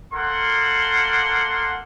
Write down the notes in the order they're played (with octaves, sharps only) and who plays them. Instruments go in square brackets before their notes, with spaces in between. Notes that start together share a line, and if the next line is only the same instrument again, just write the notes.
[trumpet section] A#3 A4 F#5 C6